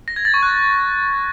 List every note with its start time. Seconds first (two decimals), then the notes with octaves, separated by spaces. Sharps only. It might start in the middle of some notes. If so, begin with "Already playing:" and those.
0.08 A#6
0.16 G#6
0.25 A6
0.34 C#6
0.43 F#6